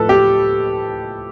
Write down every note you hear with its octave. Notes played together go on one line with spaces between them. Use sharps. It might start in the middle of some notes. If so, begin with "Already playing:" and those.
Already playing: A2 F3 A4 B4
G4